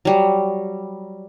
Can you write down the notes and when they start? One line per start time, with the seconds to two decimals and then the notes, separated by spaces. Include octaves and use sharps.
0.05 F#3 G3